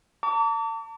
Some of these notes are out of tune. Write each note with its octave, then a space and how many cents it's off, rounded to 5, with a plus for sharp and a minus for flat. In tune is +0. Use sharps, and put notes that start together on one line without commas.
A5 +40 D6 -45